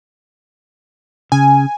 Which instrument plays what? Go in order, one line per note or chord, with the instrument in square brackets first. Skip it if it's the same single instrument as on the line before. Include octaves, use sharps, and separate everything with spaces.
[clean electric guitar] C#3 [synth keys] G#5